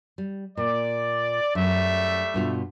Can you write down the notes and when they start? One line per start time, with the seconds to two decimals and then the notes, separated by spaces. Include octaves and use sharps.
0.18 G3
0.57 A#2 D5
1.55 F#2 G3 A3 E5
2.34 G2 B2 F4